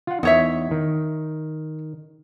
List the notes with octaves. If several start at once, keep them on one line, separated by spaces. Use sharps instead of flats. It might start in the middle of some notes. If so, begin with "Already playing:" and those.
F4 F#5
E2 D#4 C#5 E5
D#3